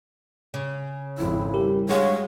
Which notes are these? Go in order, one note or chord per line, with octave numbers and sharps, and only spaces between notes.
C#3
G#1 F2 E4
G3 G4 A#4
G#3 D4 F#4 G#4 C#5 F5